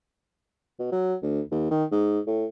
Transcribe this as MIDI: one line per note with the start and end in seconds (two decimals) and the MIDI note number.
0.79 0.88 47
0.92 1.15 54
1.22 1.41 38
1.51 1.68 39
1.71 1.84 51
1.92 2.20 44
2.27 2.46 45